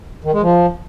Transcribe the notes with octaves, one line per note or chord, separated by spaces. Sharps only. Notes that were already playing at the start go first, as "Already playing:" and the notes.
D#3
G#3
F3